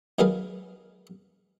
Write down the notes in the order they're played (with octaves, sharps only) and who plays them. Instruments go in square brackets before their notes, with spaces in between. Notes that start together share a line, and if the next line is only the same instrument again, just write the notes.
[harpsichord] D#3 F#3 G#4 A#4 B4 F5